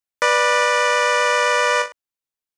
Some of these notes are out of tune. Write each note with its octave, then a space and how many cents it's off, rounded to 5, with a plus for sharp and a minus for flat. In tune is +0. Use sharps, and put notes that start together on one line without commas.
B4 -15 D5 +15